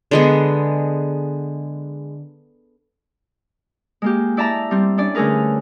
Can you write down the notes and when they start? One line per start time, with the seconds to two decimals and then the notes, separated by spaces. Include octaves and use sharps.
0.11 D3 G#3 B3
4.02 G#3 A#3 G4
4.37 E4 D5 E5 A5 A#5
4.71 G3 C4
4.98 C#4 D4 D5
5.15 D3 A3 C#4 G#4 A#4 B4